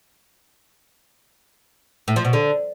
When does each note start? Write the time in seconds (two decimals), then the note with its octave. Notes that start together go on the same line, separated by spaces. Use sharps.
2.08 A2
2.16 F3
2.25 B2
2.33 D3